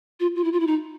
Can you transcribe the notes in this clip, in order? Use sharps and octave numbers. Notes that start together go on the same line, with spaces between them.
F4
F4
E4
F4
E4
D#4